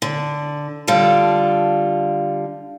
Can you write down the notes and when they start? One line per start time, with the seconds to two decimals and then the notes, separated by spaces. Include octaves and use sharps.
0.02 D3
0.87 D3 G3 F4 A4